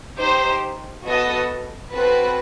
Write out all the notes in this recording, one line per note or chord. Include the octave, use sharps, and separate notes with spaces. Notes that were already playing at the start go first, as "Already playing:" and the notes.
D#4 G4 C5
B3 F#4 A4 D#5
C4 F#4 A4 B4